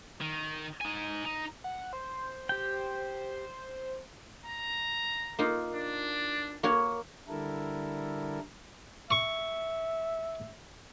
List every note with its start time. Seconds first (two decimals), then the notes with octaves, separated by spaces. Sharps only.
0.21 D#3
0.81 D#4 G#5
1.25 D#4
1.64 F#5
1.93 C5
2.49 G4 G5
4.46 A#5
5.39 A#3 D#4 F4
5.74 D4
6.63 A#3 F#4 C#5
7.28 D3 G3 E4 A4 A#4
9.11 E5 C#6